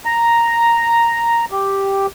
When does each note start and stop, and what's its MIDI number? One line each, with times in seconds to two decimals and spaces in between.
0.05 1.45 82
1.51 2.07 67